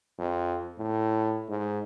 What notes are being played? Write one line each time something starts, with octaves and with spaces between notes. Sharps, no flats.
F2
A2
G#2